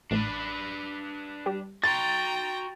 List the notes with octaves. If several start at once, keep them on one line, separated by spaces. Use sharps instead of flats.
A1 A2 E3 D4 B4
G3 G4
F#4 G5 A#5 C6 A6